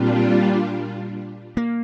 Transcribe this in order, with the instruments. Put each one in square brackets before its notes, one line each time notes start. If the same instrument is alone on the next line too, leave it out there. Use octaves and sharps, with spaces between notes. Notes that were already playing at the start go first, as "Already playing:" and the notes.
Already playing: [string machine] A#2 G3 D4 F4 [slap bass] C4
[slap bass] A#3